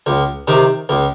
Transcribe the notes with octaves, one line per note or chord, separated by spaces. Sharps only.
C#2
C3 D#3
C#2